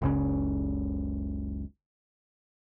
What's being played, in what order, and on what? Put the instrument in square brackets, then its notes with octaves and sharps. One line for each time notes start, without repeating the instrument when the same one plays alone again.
[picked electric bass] F#1 C#2 C#3